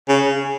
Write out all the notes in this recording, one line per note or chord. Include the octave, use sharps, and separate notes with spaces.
C#3